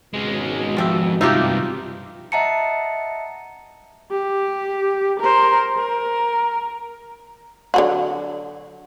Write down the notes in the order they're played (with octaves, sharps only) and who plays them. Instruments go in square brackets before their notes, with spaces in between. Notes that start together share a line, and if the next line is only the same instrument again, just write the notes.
[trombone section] G#1 G#2 B2 [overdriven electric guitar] G#3 C#4
[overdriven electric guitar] F2 [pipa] F4 G4 E5
[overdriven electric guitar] G2 C3 [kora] D#4 F4 G4 [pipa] E5
[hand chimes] D#5 E5 F#5 A5 A#5 C#7
[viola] G4
A#4 C5
A#4
[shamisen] D3 F#3 F#4